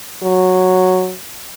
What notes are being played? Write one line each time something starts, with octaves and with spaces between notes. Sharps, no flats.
F#3